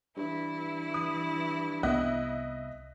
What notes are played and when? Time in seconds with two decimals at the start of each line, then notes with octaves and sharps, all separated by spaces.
0.17 G2 E3 E4
0.94 D#6
1.83 C2 B3 D#5 E5 F#6